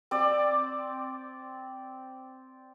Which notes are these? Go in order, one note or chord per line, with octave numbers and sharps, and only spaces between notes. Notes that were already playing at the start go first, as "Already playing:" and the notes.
C4 D5